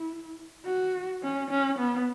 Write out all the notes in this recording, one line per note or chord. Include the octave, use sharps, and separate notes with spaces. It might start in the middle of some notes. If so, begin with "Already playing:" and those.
Already playing: E4
F#4
C#4
C#4
B3